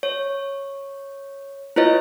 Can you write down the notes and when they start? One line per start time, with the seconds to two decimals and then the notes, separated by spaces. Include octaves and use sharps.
0.03 C#5
1.76 E4 F4 B4 C#5 D#5